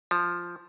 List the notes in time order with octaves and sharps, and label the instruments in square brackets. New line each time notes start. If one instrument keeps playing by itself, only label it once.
[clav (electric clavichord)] F3